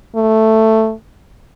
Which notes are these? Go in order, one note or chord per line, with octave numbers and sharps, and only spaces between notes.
A3